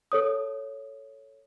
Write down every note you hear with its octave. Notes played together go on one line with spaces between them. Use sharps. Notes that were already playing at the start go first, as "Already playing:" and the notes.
A4 C#5 D#6